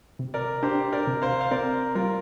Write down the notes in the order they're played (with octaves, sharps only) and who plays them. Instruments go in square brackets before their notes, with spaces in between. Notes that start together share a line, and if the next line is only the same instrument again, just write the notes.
[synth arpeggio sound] C3
[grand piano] A#4 D5
[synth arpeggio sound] D4 [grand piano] G4 C5
[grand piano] A#4 D5
[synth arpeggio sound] C3
[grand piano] C5 F5
F5
[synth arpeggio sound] C4 [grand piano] A#4 D5
[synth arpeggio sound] G3 [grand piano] F4 A#4